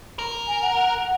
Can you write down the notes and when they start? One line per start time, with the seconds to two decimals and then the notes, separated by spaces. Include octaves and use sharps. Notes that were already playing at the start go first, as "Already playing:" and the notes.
0.19 A#4
0.47 G#5
0.62 F#5
0.76 F#5